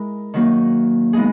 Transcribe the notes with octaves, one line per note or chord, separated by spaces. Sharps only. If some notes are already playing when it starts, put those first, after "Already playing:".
Already playing: G#3 E4 A#4
D#3 F#3 A#3
G#3 B3 D#4 G#4